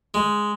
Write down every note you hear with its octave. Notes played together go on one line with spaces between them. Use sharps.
G#3